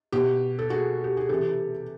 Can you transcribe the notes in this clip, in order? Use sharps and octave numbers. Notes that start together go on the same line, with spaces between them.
B2 G4
A4
F#4 G#4
G4
G#4
C3 E3 G4 A4